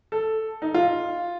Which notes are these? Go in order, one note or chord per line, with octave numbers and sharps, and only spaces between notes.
A4
D#4
F4